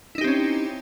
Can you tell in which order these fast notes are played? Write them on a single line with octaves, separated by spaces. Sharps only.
E4 D#4 G4 C4 C#4